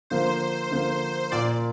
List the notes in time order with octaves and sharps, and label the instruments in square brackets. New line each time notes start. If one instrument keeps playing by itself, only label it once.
[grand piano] D3 F3 A#3 [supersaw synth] C5
[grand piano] D3 F3 A#3
[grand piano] A#2 A#3 F4 [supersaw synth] D5